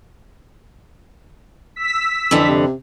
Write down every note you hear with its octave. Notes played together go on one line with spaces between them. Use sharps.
E6 B6
F2 D3 E3
C3